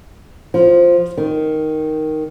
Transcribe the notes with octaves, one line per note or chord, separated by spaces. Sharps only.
F3
D#3